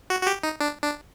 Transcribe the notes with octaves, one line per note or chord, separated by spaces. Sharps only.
F#4
F#4
G4
D#4
D4
D4